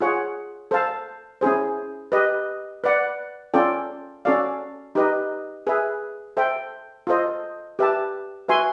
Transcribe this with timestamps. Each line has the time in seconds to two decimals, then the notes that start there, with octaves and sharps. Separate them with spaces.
0.01 F4 G#4 C#5 F#5
0.71 A4 C5 F5 A5
1.41 C#4 E4 G#4 C5
2.12 G4 B4 D#5
2.84 B4 D5 F#5
3.54 C#4 F4 A4 D5 G5
4.25 C#4 F#4 A4 D5 F5
4.95 D#4 G4 B4 D#5
5.67 G#4 B4 E5
6.37 A4 C5 E5 G5
7.07 F4 A4 C5 D#5
7.79 G4 B4 E5 A5
8.48 F#4 B4 E5 G#5 C6